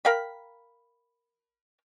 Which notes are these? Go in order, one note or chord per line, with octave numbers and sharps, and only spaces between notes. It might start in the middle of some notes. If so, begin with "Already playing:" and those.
A#4 F5 G5 B5